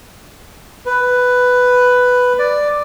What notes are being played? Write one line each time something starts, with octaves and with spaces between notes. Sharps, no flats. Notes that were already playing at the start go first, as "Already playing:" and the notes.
B4
D5